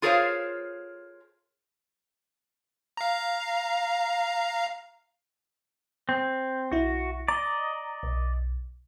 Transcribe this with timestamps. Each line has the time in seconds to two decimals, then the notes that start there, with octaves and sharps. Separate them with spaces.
0.02 F4 G#4 A#4 C5 C#5 F5
2.97 F5 A#5
6.09 C4
6.72 B1 E4 F#4
7.28 D5 D#5 A#5
8.03 B1